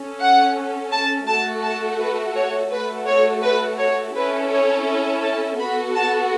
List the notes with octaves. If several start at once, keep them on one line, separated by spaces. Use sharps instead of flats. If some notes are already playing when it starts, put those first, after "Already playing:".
Already playing: C#4 A4
F#5
A5
A3 F#4 A4 A5
A5
B4
C#5
A3 F#4 A4 B4
C#5
B4
C#5
C#4 E4 A4 B4
C#5
A5
B3 F#4 A4 B5
A5